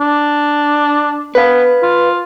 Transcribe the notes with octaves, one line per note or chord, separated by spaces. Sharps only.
D4
B3 B4 F5
F4